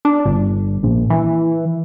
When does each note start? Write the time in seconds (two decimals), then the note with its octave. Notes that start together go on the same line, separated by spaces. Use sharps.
0.05 D4
0.25 G1
0.83 A#1
1.10 E3